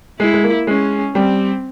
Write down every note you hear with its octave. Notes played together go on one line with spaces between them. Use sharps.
G#3 E4
G#3
A#3
G#3 C#4
G3 C4